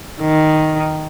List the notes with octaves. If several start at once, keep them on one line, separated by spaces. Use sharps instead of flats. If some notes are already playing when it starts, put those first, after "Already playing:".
D#3